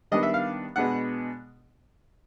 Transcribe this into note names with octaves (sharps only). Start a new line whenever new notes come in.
D#3 G3 B3 D4 D#5
E5
F5
B2 G#3 B3 D4 F#5